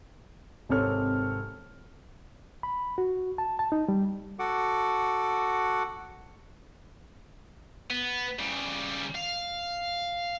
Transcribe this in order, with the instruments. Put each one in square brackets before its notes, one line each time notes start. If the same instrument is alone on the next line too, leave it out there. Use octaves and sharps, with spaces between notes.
[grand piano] G#1 C3 C4 A4 C#5 F6
[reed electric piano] B5
F#4
A5
A5
D#4
G3
[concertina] F#4 A4 F#5 D6
[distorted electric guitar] B3
C#3 G3
F5